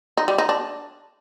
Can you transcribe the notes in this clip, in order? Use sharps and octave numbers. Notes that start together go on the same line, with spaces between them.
D#4
G3
D#4
D4